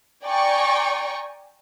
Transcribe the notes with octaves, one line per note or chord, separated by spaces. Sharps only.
D5 G5 G#5 A#5 C#6